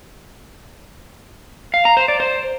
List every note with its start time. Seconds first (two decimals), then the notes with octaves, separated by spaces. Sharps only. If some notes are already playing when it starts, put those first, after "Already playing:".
1.74 F5
1.85 A#5
1.97 C5
2.08 D5
2.20 C5